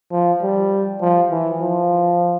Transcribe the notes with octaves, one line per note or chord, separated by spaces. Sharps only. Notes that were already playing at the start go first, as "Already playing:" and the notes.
F3
G3
F3
E3
F3